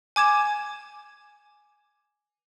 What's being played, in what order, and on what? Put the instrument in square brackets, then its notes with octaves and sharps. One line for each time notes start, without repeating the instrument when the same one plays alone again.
[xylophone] G#5 D6 G#6 E7